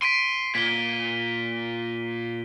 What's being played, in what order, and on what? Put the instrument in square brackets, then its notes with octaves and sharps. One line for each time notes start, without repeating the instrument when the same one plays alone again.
[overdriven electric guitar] C6 [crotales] B6 D7 D#7
[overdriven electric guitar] A#2 [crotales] B6 G7